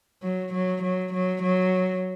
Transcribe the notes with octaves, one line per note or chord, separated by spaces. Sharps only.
F#3
F#3
F#3
F#3
F#3